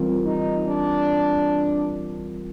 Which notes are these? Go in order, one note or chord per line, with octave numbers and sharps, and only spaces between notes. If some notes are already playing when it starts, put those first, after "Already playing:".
Already playing: E3 G3 C4 F4 A#4
D#4
D4